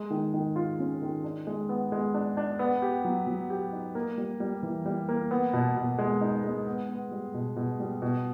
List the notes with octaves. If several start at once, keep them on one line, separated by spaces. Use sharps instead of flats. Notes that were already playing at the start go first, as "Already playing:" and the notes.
Already playing: G#3
D#3
D#3
F4
C#4
D#3
D4
G#3
B3
G#3
D4
D4
B3
G4
F#3
F#3
G4
D#4
A#3
G3
G3
E3
G3
A#3
B3
B2
B2
G#3
D#4
G#3
B3
B3
G3
B2
B2
G3
B2